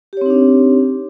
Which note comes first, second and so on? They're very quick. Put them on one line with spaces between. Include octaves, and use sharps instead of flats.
G4 C#5 C4 D#4 D4